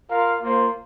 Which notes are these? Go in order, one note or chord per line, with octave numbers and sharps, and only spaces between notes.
F4 A#4 F5
A#3 F4 C5